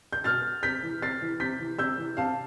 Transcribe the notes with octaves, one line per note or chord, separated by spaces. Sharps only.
G6
B2 F6 A6
C3 G6 B6
E3
C3 A6 C7
E3
C3 G6 B6
E3
C3 E6 G6
E3
C3 F5 A5